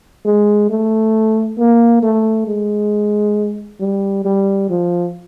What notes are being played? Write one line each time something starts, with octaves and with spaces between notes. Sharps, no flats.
G#3
A3
A#3
A3
G#3
G3
G3
F3